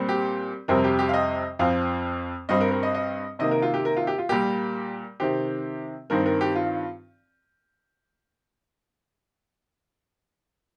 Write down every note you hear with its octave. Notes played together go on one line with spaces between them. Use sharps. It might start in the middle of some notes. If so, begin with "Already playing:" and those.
Already playing: A#2 G3 C4
G4
F2 C3 G3 C4 A#4
G4
G4
F5
D#5
F2 F3 C4 F5
G2 G3 C4 D#5
A#4
A#4
D#5
D#5
C3 D#3 A#3 D#5
A#4
F4
G4
A#4
F4
G4
F4
A#2 G3 A#3 G4
C3 D#3 C4 G4
G2 D#3 C4 A#4
A#4
G4
F4